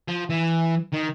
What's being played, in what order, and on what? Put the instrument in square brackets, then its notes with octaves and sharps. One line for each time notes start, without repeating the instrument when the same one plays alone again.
[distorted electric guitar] F3
E3
D#3